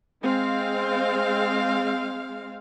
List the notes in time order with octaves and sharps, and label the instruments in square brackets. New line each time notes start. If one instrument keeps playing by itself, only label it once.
[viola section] G#3 C4 F5